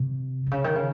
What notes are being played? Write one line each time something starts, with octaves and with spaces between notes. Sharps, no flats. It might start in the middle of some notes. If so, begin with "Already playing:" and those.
Already playing: C3
C3
C#3
D#3
C#3